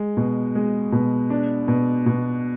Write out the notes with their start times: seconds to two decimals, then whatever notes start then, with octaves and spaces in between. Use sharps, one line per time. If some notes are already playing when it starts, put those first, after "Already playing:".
Already playing: G#3
0.17 B2
0.55 G#3
0.92 B2
1.30 D4
1.68 B2
2.06 B2